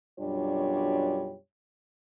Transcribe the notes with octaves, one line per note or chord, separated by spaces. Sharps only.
F#2 B2 G3 D4 F4 C#5